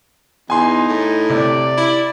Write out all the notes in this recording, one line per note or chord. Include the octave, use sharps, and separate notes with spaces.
E2 D#4 G#5 C6
A2
C3 D5
E4